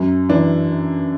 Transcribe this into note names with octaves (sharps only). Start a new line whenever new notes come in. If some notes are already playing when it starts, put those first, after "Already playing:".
Already playing: F#2
E3 D4